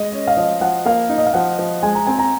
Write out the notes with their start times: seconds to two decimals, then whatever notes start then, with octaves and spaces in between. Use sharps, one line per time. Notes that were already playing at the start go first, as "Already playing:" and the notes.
Already playing: G#3 D#5
0.12 C#4
0.27 F5
0.37 F3 D#5
0.61 F3 F#5
0.85 A#3 F5
1.09 D#4
1.18 D#5
1.26 F5
1.34 F3 F#5
1.59 F3
1.83 G#3 G#5
1.95 A#5
2.07 C4 G#5
2.19 A#5